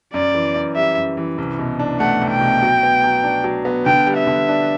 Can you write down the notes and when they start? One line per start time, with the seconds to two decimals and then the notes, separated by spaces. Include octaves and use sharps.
0.14 F#2 D5
0.35 E3
0.56 F#2
0.76 G3 E5
0.97 F#2
1.17 E3
1.38 C2
1.59 B2
1.79 D4
2.00 A3 F#5
2.21 C2
2.31 G5
2.41 B2
2.62 F#3
2.83 B3
3.04 F#3
3.24 D4
3.44 F#3
3.65 B3
3.86 D3 G5
4.07 G3
4.17 E5
4.27 D3
4.48 D4